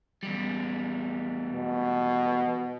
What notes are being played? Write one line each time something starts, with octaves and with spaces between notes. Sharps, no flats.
E2 G3
B2